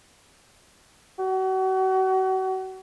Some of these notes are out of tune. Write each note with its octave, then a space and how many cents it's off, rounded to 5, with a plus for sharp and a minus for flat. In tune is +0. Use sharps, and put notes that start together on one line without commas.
F#4 +35